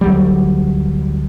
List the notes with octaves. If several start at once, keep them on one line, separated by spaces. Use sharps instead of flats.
D2 F#3 G3